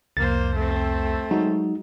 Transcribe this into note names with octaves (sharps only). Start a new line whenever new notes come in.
C2 F2 A#3 C5 A6
A3 C4
F#3 G#3 D#4 F#4